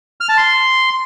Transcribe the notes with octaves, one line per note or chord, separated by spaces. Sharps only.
F6
A5
C6